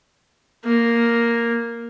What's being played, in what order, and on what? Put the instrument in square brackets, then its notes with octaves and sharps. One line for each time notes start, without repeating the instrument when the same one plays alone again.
[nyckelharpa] A#3